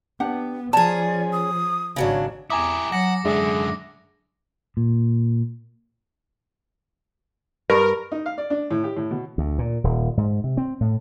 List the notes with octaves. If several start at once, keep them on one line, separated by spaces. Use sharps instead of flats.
B3 D4 G4 F#5
F3 C#4 G#4 D5 A5 A#5
D#6
G#1 C#3 F#3 D4 C#5
E2 E4 G4 G#5 A#5 D6 D#6
F#3 F#5 A#6 C#7
F#2 D3 G#3 D4 G#4 E5
A#2
G2 A#4
D#4
F5
D5
D4
A2
G4
A2
B2
D2
A#2
D#1
G#2
C3
C4
A2